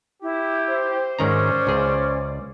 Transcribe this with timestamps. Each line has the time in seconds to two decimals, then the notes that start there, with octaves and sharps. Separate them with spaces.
0.22 E4 G4
0.70 C5
1.19 G#2 D#3 C#4 D5 A#5
1.67 C#2 G#4